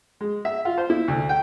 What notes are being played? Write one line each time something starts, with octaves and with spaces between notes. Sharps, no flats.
G#3
E5
F4
C5
E4
D2
G5